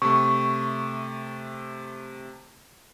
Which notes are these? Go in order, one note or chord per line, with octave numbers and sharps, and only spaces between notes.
C3 A3 C#6